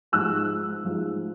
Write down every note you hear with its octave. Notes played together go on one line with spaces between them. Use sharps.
G#2 F3 G#3 E6 F#6
G#2 F3 G#3